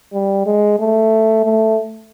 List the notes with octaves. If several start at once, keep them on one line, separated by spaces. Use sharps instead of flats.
G3
G#3
A3
A3